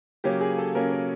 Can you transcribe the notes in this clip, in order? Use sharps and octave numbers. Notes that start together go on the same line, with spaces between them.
C#3 F#3 A#3 C#4 G4
G#4
A4
C#3 F#3 A#3 C#4 A#4
A#4